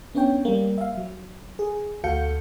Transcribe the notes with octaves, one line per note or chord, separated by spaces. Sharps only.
B3 C#4 D4 C#5 G5
G3 A#3
E5 F5
F#3
G#4
D2 F#4 A4 F5 G6 C#7